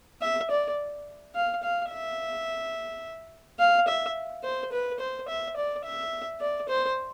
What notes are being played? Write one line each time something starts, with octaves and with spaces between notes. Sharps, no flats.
E5
D5
F5
F5
E5
F5
E5
C5
B4
C5
E5
D5
E5
D5
C5